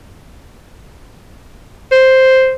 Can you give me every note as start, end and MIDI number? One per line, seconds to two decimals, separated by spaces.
1.92 2.56 72